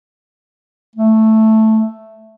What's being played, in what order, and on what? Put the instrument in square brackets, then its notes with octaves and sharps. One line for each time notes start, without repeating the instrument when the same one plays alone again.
[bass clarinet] A3